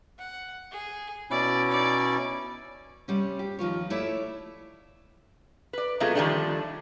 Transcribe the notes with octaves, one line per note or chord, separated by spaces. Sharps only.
F#5
G#4
B2 C#4 E4 D5
D#4 D5
C3 G3 C#4
G4
D#3 F3 F4 C#5
A3 E4 C#5 D5 E5
B4 D5
C3 F#3 G#3 A3 B3 F4
D3 D#3 F3 G3 A3 D4